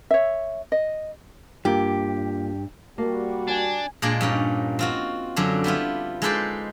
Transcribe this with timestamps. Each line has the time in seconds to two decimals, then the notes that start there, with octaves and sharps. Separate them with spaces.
0.11 C#5 E5
0.72 D#5
1.65 G2 A#3 F4 G4
2.98 G3 A#3 F#4 A5
3.48 D4 G#5 E7
4.02 A#2 G#3 A#3 D4 D5 D#5
4.21 G2 C#4 D#4 D5
4.79 C4 F4 F#4
5.36 F#2 D3 F#3 D4
5.64 G3 B3 E4 F4
6.22 G#3 D#4 A4 B4 C5 D5